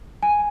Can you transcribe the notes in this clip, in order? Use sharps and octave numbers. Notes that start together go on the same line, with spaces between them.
G#5